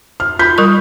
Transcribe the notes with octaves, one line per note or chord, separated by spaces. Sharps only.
F6
F4 B5 G6
G3 A#4 C#6